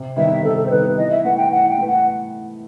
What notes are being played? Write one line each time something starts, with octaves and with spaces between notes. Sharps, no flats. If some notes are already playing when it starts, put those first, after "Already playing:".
Already playing: C3
D#3 G3 B3 D#4 E5
C3 A4
A4
C5
D#3 G3 B3 D#4 B4
E3 D#5
E5
A3 E4 B4 F#5
G5
E3 F#5
G5
A3 E4 B4
F#5